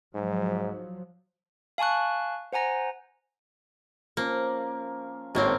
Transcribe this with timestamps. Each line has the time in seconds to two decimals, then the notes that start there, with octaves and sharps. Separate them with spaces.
0.15 G#2 F3 F#3
1.78 F5 G#5 A5 C#6 F#6
2.53 C5 F#5 G#5 A#5 A#6
4.17 F3 A#3 C#4
5.35 G#1 A2 A#3 C4 C#5 C#6 F6